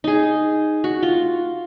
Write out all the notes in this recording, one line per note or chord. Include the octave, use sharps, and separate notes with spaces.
D#4 G#4
F#4
F4